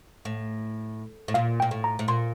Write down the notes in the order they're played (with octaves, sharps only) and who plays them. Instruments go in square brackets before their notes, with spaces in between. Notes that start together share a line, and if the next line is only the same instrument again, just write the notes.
[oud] A2
A2
[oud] A#2 [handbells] F5
[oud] A#2 [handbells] G5
[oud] A2
[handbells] A#5
[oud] A2
[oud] A#2 [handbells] C6